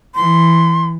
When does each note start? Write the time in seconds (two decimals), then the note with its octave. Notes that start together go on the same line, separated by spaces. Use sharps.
0.15 E3 C6